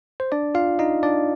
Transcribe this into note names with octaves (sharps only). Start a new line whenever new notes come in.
C5
D4 D5
F4 F5
D#4 D#5
D4 D5